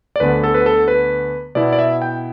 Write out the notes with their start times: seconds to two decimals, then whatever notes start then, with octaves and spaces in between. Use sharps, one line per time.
0.16 D5
0.20 D2 D3 B3 B4
0.44 A4
0.54 B4
0.66 A4
0.88 B4
1.55 B2 B3 E4 D5
1.73 D5
1.79 E5
2.02 G5